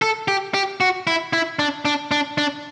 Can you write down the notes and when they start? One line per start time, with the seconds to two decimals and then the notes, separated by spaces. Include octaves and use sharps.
0.02 A4
0.28 G4
0.54 G4
0.81 F#4
1.07 E4
1.33 E4
1.59 D4
1.85 D4
2.11 D4
2.38 D4